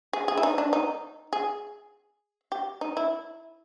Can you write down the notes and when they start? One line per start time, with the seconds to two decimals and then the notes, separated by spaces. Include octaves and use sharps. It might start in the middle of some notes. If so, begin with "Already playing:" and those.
0.13 G#4
0.28 G#4
0.37 E4
0.43 D#4
0.58 D4
0.73 D#4
1.33 G#4
2.52 G4
2.81 D#4
2.97 E4